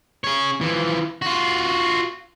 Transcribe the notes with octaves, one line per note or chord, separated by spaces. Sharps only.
G#4 C#5
E3 F3
F4 F#4